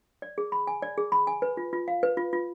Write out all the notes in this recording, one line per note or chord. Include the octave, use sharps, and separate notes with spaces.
D5
G#4
B5
G#5
D5
G#4
B5
G#5
B4
F4
F4
F5
B4
F4
F4